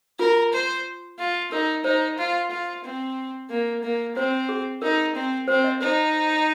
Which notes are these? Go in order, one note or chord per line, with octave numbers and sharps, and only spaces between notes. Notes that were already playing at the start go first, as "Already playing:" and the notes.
F4 A#4
C5
F4
D#4 A#4
D#4 C5
F4
F4
C4
A#3
A#3
C4 C5
G#4
D#4 A#4
C4
C4 C5
D#5
D#4 C5